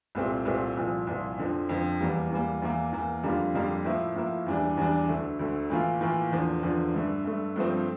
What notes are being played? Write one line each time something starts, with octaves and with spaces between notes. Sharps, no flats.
C2 A#2 A3 C4 G4
C2 A#2 A3 C4 G4
C2 A#2 F3
C2 A#2 F3
F2 D3 F3
F2 D3 F3
E2 E3 G3 A#3
E2 E3 G3 A#3
E2 E3 A#3
E2 E3 A#3
F2 D3 G3 A#3 F4
F2 D3 G3 A#3 F4
A2 F3 A#3 E4
A2 F3 A#3 E4
E2 E3 G3 D4
E2 E3 G3 D4
D2 D3 A3
D2 D3 A3
A2 E3 A#3 F4
A2 E3 A#3 F4
E2 D3 F3
E2 D3 F3
G2 D3 A3
G2 D3 A3
G2 F3 A3 C4